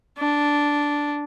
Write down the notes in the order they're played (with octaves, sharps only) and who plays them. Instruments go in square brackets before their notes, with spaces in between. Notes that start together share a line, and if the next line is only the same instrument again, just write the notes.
[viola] D4